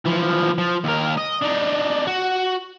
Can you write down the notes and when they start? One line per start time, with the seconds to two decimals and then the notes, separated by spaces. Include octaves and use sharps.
0.06 E3 F3
0.58 F3
0.84 D#2 A#4
1.17 D#5
1.41 D4 D#4
2.07 F#4